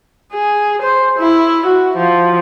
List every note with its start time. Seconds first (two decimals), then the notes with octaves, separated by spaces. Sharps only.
0.34 G#4
0.82 C5
1.18 E4
1.66 F#4
1.97 F3